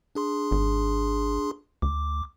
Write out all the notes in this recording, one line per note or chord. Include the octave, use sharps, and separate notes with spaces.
D4 G#4 C6
G#1
D2 D6